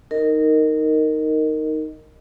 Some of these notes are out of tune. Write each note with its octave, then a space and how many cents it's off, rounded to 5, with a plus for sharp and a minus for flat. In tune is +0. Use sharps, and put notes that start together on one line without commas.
D#4 +0 A#4 -15 D#5 +0